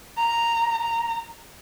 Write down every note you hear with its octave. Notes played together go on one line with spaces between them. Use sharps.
A#5
A#5